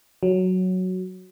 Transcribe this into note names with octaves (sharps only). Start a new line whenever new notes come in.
F#3